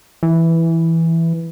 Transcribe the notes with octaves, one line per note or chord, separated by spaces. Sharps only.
E3